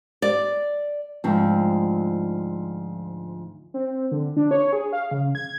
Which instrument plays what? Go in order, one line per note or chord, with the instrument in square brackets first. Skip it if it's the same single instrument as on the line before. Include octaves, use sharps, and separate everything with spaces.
[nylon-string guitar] D5
D2 G#2 F3 C4
[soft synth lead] C4
D3
D4
C#5
G#4
F5
C#3
G#6